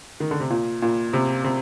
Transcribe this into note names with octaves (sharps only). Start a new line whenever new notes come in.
D#3
D3
C3
A#2
A#2
C3
C3